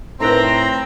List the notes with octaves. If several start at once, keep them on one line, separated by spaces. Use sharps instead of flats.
A2 C4 D#4 A#4 B4 A#5